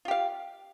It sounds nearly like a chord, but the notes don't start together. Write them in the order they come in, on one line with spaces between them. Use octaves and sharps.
F4 G4 F5